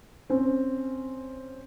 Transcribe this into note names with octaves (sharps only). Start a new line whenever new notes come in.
C4 C#4